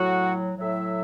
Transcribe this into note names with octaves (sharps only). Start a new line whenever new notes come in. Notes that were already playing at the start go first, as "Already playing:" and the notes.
Already playing: A2 F#3 F#4
A2 F#3 E5